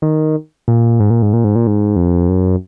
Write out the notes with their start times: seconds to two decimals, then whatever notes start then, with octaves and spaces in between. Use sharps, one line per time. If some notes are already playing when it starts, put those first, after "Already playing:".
0.02 D#3
0.68 A#2
1.00 G#2
1.10 A#2
1.22 G#2
1.33 A#2
1.44 G#2
1.55 A#2
1.67 G#2
1.96 F2
2.29 F#2